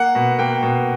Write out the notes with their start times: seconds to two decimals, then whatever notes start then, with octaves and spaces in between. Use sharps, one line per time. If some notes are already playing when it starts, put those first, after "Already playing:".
Already playing: A#3 F#5
0.15 B2
0.39 A#3 G5
0.62 B2